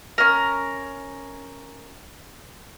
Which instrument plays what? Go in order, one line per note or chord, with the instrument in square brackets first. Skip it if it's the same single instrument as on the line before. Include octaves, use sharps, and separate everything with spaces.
[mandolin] C#4 A#4